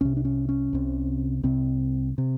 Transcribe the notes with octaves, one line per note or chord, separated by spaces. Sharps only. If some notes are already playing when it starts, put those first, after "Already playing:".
C2 C3 C#4
D4
C#4
C#4
C2 C3
C2 C3 C4
C3